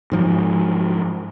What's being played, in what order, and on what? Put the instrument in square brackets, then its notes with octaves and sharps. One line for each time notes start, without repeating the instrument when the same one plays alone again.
[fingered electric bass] G#2 F3 F#3